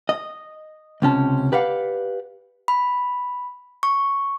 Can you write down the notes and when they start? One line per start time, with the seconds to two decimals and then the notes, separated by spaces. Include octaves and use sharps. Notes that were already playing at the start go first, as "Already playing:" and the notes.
0.09 D#5
1.02 C#2 C3 C#4 A5
1.52 G4 B4 D5 F5 F#5
2.68 B5
3.83 C#6